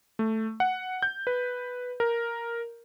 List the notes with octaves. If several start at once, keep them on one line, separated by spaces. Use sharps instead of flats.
A3
F#5
G6
B4
A#4